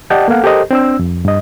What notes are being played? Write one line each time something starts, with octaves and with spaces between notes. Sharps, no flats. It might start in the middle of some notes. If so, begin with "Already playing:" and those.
G4 D5 D#5 F#5 G5 A5
A#3 B3 A4 F5 F#5
G4 A4 A#4 C5 D#5
C4 D4 E6
F2
G2 D#5